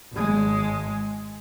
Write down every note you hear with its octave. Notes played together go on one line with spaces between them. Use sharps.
G#1 G#3